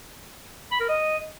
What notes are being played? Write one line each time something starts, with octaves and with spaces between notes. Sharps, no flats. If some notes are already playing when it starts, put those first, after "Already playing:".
B5
A#4
D#5